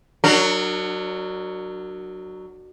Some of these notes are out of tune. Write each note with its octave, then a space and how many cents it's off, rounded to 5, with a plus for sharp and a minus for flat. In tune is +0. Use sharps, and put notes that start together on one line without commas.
F#3 +5 D4 +40 A#4 -25